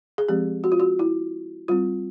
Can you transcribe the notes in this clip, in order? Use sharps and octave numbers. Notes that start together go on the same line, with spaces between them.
G#4
F3 G#3 C4 G4
F#4
F4
F#4
E4
G3 C4 F4